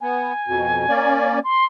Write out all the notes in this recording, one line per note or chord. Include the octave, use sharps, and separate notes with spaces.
B3 G#5
F2 B2
A#3 C#4 D5
C6